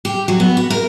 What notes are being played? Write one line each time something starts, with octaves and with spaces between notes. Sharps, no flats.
G4
F#3
B3
F#4
A#4